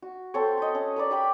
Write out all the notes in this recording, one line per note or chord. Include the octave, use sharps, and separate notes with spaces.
F#4
C4 A4 C5 C#5
D#5 B5
C#4
A#4 B4 D5
G4 G5 B5